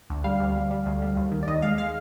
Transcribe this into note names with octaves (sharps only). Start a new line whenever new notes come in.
D2
G3 F5
D2
G3
G3
D2
G3
D#2
D#3
D5
D#2 D#5
G#3 F5
G#3 F5